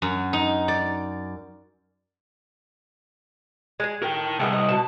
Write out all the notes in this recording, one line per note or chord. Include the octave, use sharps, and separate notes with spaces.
F#2
D#4
D5
G#3 G#4
A2 A#4 G5
C2 C#3 G#3 B3
D#5
B2 A5